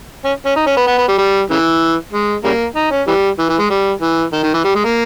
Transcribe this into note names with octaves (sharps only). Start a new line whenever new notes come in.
C#4
C#4
D#4
C#4
B3
B3
B3
G3
G3
C#3 E3
G#3
C#3 G3 A#3
D#4
C#4
E3 G3
E3
E3
G#3
G3
E3
D#3
D#3
E3
G3
G#3
A#3